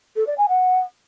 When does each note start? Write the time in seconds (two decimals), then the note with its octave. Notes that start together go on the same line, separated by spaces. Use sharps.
0.16 A4
0.27 D5
0.38 G#5
0.49 F#5